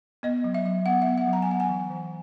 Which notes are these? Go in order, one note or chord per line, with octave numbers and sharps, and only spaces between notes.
B3 D#5
F#3
E5
F#3
B3 F#5
E5
B3
F#5
F#3
A#5
G#5
B3 F#5
G#5
E3
E3